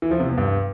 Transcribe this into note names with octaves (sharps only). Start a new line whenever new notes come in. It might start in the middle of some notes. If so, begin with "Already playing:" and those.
E3
F3
C3
E2
G2